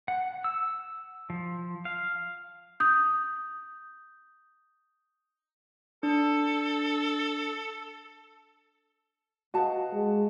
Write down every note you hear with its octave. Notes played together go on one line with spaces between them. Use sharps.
F#5
E6
F3
F5
D#6 G6
D4 A4
F#4 B4 D#5 F5 F#5 A5
G#3